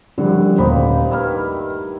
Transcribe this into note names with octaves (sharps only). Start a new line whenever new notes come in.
F#2 A2 D3 F3 G3 F#5
D#1 F3 G3 D#4 C5 B5
G2 D#3 E4 B5 F6